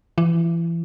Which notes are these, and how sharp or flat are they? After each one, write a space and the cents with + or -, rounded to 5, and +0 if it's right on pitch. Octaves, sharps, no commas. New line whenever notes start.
E3 +30